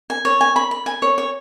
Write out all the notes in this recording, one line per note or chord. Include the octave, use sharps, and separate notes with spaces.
G#5
C#5
G#5
B5
B5
G#5
C#5
C#5